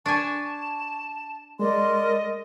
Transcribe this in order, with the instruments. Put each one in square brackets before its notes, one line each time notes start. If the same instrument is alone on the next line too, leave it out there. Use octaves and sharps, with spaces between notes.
[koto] D4 G#5 [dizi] A5 [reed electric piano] C#6
[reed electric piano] G#3 [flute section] A#4 D5 C6 [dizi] D#5